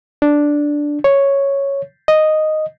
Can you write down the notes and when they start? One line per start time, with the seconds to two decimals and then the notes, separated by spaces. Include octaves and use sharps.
0.22 D4
1.04 C#5
2.08 D#5